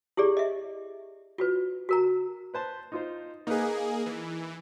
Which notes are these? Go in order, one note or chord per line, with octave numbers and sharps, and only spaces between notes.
E4 G4 G#4 D5
D#5 E5
F4 F#4 B4
F#4 A#4 A#5
B4 C5 A5
D#4 F4 C5
A#3 D#4 G#4 A#4 B4
E3